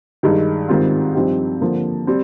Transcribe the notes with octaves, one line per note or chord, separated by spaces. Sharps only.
G2 D#3 G#3 D#4
G#2 D#3 G3 C4 F4
G2 F3 C4 D#4 G4
D3 F3 A#3
G3 C4